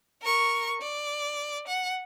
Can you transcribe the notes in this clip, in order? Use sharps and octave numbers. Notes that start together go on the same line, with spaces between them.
A#4 C#6
D5
F#5